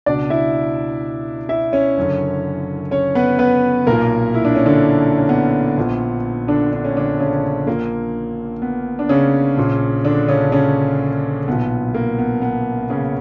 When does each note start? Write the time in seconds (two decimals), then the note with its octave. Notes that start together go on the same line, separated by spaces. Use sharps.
0.06 C#2 B2 D4 D5
0.30 E4 E5
1.49 E4 E5
1.73 C#4 C#5
1.97 F#1 F#2 D3
2.91 C#4 C#5
3.15 B3 B4
3.39 B3 B4
3.87 B1 A#2 A#3 A#4
4.34 E4
4.45 D4
4.55 C#4
4.66 D3 D4
5.18 C#4
5.29 B3
5.77 A#1 A#2
6.48 D3 D4
6.72 D4
6.85 C#4
6.97 D3 D4
7.19 C#3 C#4
7.67 A#1 A#2 A#3
8.62 B3
8.99 D4
9.09 C#3 C#4
9.57 A#1 A#2
10.05 D3 D4
10.28 C#3 C#4
10.52 C#3 C#4
11.47 B1 A#2 B3
11.94 A#3
12.18 B3
12.42 B3
12.90 C#3 C#4